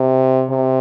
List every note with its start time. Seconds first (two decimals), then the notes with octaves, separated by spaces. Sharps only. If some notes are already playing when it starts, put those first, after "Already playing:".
Already playing: C3
0.50 C3